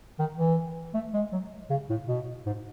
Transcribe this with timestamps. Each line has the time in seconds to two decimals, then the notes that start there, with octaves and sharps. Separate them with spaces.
0.19 D#3
0.37 E3
0.94 A3
1.14 G#3
1.32 F#3
1.70 C#3
1.90 A2
2.07 B2
2.46 G#2